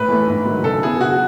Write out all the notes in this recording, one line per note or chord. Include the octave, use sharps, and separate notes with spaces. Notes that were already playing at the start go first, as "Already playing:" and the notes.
Already playing: A2 B4
E3 A3
G#2
D#3 F#3
C#3 A4
F#3 B3 E4 G#4
C#3 F#4